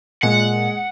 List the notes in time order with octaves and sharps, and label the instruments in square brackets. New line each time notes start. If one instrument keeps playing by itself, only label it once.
[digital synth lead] A#2 [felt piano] G#3 [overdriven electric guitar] F#5